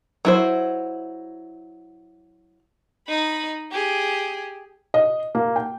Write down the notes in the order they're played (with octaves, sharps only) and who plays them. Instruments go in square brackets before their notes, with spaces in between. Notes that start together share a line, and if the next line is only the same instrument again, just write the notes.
[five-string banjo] F#3 E4 C5
[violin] D#4 B5
G4 G#4
[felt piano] D#5
A#3
G5